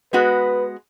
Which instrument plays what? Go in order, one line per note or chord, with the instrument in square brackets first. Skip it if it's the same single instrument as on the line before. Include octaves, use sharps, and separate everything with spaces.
[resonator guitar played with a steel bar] G#3 B3 F#4 [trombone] B4